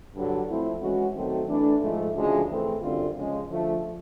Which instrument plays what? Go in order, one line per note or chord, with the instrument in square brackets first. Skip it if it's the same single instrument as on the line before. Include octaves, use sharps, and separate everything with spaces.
[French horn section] G2 D3 F#3
F3 A3 C4 E4
E3 G#3 C#4 F#4
D#3 F#3 A3 C4
E3 A3 D4
G#2 F3 A3
D2 C#3 F3 G#3
E3 A3 C4
F#2 D3 G3 C4 F4
F2 C#3 F3 G#3
D3 F3 A3